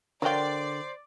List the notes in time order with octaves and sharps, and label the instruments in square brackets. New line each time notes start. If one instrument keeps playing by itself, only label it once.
[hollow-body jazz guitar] D3 A#4 G5 [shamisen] F#3 F4 [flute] C5 [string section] D5